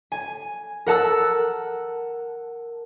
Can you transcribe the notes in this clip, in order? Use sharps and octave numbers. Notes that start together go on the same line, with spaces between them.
G#5
A#4 F#5 A5 E6